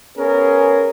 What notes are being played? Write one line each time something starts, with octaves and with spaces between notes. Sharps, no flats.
B3 C#4 G#4 A#4